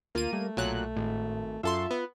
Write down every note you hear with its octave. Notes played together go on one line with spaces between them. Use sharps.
D2 A#3 F4 D#7
G3 A3
B1 A#2 F#3 F#6
G#1 A2
F#2 F4 A4 E5 C6
B3